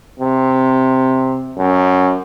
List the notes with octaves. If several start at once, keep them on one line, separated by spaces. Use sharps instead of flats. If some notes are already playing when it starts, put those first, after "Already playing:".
C3
F#2